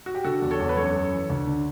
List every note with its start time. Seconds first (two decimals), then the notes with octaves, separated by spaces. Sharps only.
0.06 F#4
0.15 G4
0.25 D3 F#4 A4
0.42 E2
0.51 A4 C#5
0.59 E2
0.69 B4
0.76 F#2 A4 C#5
0.94 F#2
1.12 E3
1.30 D2
1.47 D3